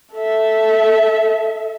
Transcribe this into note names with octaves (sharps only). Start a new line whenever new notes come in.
A4 E5